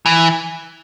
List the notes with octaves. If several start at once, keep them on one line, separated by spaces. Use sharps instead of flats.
E3